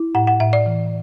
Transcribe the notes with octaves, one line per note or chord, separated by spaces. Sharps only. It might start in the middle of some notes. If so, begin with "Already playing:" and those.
Already playing: E4
A2 F#5
F#5
A2 E5
D5
E3